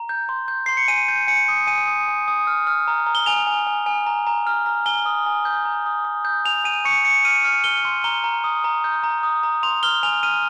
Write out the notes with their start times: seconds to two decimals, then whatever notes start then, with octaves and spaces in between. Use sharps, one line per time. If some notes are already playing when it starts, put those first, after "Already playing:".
Already playing: A#5
0.09 G6
0.29 C6
0.48 G6
0.66 C6 C7
0.77 C#7
0.88 G#5 D#7
1.08 G6
1.27 G#5 C#7
1.48 D#6
1.67 G#5 D#7
1.88 D#6
2.08 G#5
2.28 D#6
2.47 F6
2.67 F6
2.88 A#5
3.06 A#5
3.15 G7
3.26 G#5 F7
3.47 G#5
3.67 G#5
3.86 G#5
4.07 A#5
4.27 A#5
4.47 F6
4.66 A#5
4.86 G#5 G7
5.06 D#6
5.26 G#5
5.45 G6
5.65 A#5
5.86 D#6
6.05 D#6
6.25 G6
6.45 G#5 F7
6.64 G#5 D#7
6.85 C#6 C#7
7.05 C#6 C#7
7.25 F6 D#7
7.44 F6
7.64 F6 G7
7.85 C6
8.04 A#5 G7
8.24 A#5
8.44 D#6
8.64 A#5
8.84 G6
9.03 A#5
9.23 D#6
9.43 A#5
9.63 C6 F7
9.83 F6 G7
10.03 G#5 F7
10.23 F6 D#7